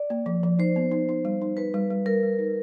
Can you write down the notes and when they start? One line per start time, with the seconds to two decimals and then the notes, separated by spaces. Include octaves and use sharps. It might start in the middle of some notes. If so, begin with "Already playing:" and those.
Already playing: D5
0.10 A#3
0.26 F3
0.43 F3
0.59 D#4 C5
0.76 B3
0.91 D#4
1.09 D#4
1.25 G3
1.42 D#4
1.57 D#4 B4
1.74 G3
1.90 G3
2.06 G3 A#4
2.23 G3
2.39 D#4